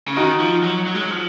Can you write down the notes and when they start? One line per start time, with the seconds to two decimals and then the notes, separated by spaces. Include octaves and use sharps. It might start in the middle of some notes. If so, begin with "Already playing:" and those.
0.08 C#3
0.16 D#3 D#4 F#4
0.40 F3
0.64 F#3
0.87 F#3
0.95 G#3
1.01 F#3
1.11 F3